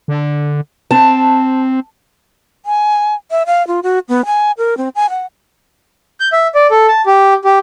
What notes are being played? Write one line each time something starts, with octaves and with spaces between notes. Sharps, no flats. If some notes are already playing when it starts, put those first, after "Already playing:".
D3
C4 A5
G#5
E5
F5
F4
F#4
B3
G#5
A#4
C4
G#5
F#5
G6
E5
D5
A4
A5
G4
G4